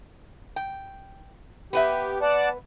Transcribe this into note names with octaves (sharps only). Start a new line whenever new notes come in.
G5
B3 G4 B4 E5
D5 F#5 A5